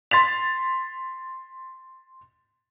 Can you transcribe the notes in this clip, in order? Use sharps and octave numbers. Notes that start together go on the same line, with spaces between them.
C6 A6 B6 F7